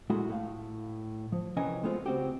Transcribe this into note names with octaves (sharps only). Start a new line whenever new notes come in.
A#2 G#3 A3 E4 F#4
A2 F5
F3
C2 E3 C#4 A#4 D#5 G#5
G#3 A3 B3 C4 F4
C#2 C4 F#4 G4